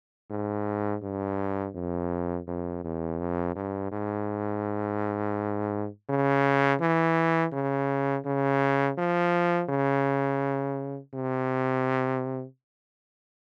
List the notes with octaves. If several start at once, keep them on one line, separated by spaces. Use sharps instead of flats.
G#2
G2
F2
F2
E2
F2
G2
G#2
C#3
E3
C#3
C#3
F3
C#3
C3